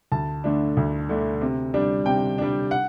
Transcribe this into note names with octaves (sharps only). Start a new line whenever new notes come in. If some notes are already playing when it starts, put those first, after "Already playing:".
D2 A5
D3 A3 D4
D2
D3 A3 D4
C3
G3 D4
C3 G5
G3 D4
F#5